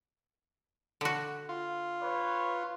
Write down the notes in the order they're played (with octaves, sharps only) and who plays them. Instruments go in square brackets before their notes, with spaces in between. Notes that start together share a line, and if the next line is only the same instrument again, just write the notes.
[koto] D3 F#4
[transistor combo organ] F4
[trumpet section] B4 C#5